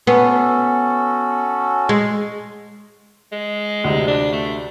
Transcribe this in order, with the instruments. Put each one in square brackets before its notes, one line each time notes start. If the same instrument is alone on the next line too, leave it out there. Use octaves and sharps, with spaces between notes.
[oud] B3 [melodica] C#4 F#4 A4
[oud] G#3
[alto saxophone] G#3
[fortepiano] D2 C3
[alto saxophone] D4
A3